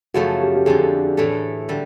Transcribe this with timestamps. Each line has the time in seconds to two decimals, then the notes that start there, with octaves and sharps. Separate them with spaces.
0.14 F#2 C#3 F3 A3 F#4
0.41 G4
0.55 G4
0.66 F2 D3 F3 G#4
1.17 A2 E3 A3
1.69 D3 G3 A4